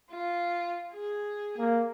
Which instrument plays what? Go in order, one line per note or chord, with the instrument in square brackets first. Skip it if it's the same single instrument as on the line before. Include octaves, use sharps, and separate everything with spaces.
[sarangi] F4
G#4
[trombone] A#3